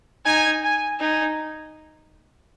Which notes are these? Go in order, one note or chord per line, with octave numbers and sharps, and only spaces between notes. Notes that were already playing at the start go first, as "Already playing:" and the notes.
D#4 G#5
G#5
D#4 G#5